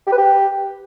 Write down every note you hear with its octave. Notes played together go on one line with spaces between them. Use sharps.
G4
B4
G4